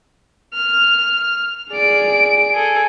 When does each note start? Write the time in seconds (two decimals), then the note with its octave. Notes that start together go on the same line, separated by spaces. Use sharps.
0.53 F6
1.72 G#4 D5 D7
2.54 G#4 A4